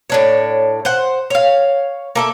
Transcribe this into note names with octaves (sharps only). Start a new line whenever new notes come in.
A2 D4 C#5
C5 F#5
C#5 F5
A#3 A4 E5